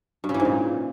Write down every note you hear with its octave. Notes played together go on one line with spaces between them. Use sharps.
G2
C#3
E3
G#2
A#2